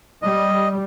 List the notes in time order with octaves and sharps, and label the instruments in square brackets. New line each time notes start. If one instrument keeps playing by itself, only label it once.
[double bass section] G3 [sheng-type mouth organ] D#5